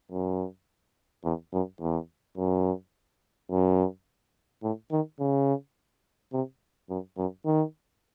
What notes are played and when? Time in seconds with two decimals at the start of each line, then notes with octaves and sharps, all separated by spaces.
0.11 F#2
1.24 E2
1.53 F#2
1.80 E2
2.38 F#2
3.51 F#2
4.63 A2
4.91 D#3
5.19 C#3
6.33 C3
6.89 F#2
7.18 F#2
7.45 D#3